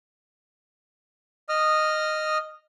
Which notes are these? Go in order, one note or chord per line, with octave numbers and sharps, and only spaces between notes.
D#5 D#6 F6